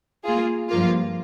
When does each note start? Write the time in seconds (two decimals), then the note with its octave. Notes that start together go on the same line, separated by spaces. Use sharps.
0.24 A#3 F4 G#4
0.69 G2 F3 A#3 F4